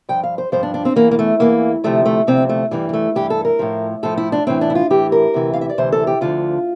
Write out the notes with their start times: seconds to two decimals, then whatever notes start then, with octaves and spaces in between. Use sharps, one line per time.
0.09 G2 F3 G5
0.24 F5
0.38 C5
0.52 G2 F3 C5
0.63 D4
0.74 D4
0.85 C4
0.96 E2 E3 A#3
1.11 A#3
1.19 A3
1.40 E2 E3 A#3
1.84 D2 C3 F3 A3
2.05 A3
2.27 D2 C3 F3 C4
2.49 A3
2.71 G2 E3 G3
2.89 G3
2.93 A3
3.15 G2 E3 G4
3.30 A4
3.45 A#4
3.59 A2 F3
4.03 A2 F3 A4
4.18 E4
4.32 D4
4.47 A2 E3 C4
4.61 D4
4.70 E4
4.75 F4
4.90 A2 E3 G4
5.12 A#4
5.34 D2 C3 E3
5.54 F5
5.61 E5
5.70 D5
5.78 D2 C3 E3 C5
5.92 A4
6.07 G4
6.21 D2 D3 F3 F4